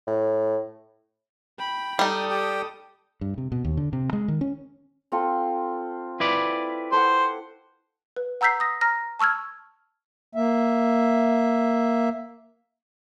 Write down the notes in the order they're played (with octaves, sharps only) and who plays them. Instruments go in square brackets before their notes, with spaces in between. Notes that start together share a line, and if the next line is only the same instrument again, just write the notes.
[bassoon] A2
[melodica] G5 [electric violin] B5
[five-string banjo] G3 D#4 [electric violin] A4 D#6
[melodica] G4 G5
[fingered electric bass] G2
C3
B2
D#2
D3
C3
G#3
D#3
C#4
[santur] C4 F4 A4
[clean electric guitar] E4 B4 D5
[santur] A4 F#5 [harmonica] C5
[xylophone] B4
F#5 A#5 E6 G6 B6 C7
D#6 A#6
A#5 F6 A#6
A5 C#6 E6 F6 G#6
[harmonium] A#3 E5